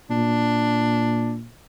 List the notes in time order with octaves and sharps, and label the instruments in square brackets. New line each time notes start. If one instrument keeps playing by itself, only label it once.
[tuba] A#2 [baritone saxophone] D4